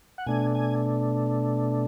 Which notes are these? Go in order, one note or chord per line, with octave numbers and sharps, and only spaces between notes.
F#5
B2 A3 D4 G#5
G#5